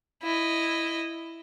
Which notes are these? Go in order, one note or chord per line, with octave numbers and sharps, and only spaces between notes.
E4 D#5